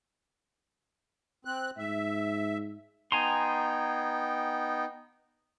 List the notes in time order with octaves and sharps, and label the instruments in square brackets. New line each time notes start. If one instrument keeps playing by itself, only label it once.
[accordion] C4 F#6
[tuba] G#2 [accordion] E5
[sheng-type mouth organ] B3 D#4 G5 [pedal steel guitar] G#5 A#5 C6